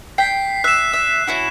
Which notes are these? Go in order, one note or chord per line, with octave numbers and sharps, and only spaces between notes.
G5 B6 C7
E5 F#6 E7
E5
C#4 E4 F#4